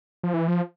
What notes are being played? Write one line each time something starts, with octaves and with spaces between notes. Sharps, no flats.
F3
E3
F3